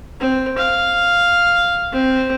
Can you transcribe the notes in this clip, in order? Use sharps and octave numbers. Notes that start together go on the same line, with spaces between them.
C4
F5
C4